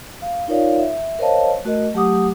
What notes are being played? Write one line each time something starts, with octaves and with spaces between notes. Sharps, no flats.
F5
D#4 F4 A#4 C#5 D5 F5
E5
A#4 C5 C#5 D#5 F5 A5
A3 F#4 A#4 D#5
F#3 A3 G4 F#5 D6 D#6